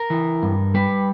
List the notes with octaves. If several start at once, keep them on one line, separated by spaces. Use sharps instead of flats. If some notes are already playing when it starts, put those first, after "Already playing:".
Already playing: A#4
E3
G2
G3 B4